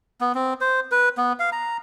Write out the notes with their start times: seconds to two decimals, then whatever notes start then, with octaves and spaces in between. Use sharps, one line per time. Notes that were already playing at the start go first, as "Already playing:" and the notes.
0.21 B3
0.35 C4
0.61 C5
0.92 B4
1.18 B3
1.39 F5
1.52 A#5